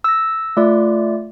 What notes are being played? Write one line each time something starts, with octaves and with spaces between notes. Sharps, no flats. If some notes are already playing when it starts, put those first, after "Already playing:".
E6 A#6
A3 F4 D5